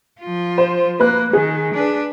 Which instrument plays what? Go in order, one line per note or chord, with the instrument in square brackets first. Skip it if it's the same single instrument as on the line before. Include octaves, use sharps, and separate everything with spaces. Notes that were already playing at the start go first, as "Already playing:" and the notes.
[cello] F3 F4
[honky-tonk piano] C5
[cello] A#3 [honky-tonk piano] B4 F#6
[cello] D#3 [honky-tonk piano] G#4
[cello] D4 B4